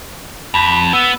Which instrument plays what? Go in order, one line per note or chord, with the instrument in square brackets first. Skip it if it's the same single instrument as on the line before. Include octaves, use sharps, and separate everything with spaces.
[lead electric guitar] F2 [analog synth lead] B5
[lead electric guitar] B3 [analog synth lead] E6